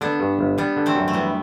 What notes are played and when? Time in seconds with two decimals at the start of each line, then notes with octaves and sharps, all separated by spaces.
0.01 D3 B3 D4
0.20 G2
0.39 G1
0.58 G3 B3 D4
0.76 D3
0.86 A3 C4
0.95 F#2
1.08 A3
1.13 E3 G3 B3